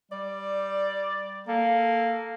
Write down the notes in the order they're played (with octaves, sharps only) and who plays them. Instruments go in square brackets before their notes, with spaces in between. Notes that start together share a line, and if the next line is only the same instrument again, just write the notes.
[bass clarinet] G3 [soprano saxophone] D5
[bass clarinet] A#3 [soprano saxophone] A4